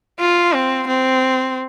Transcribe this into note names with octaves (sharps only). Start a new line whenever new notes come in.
F4
C4
C4